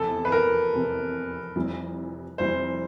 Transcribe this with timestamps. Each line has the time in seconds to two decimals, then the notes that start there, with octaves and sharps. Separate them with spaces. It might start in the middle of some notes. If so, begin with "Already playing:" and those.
Already playing: F1 E2 C3 A4
0.25 B4
0.32 A#4
0.73 F1 E2 C3
1.55 F1 F2 C3 E3 G3
2.38 F1 F2 C3 E3 G3 C5